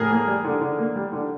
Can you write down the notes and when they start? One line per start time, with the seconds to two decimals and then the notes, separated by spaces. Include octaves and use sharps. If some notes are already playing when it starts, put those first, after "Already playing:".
Already playing: A2 G#4 A#4
0.11 A#3
0.27 G3
0.45 D3
0.61 D3
0.79 A#3
0.96 G3
1.12 D3